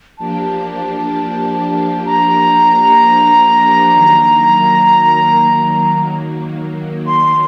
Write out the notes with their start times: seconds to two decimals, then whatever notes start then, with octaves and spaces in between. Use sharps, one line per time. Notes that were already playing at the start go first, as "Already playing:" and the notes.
0.18 F3 A#3 D4 G4 A5
2.06 A#5
3.93 D#3 F#3 A#3
7.07 C6